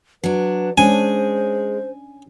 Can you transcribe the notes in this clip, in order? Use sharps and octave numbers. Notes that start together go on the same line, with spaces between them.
F#3 D4 B4
G#3 C#4 D4 C5 G#5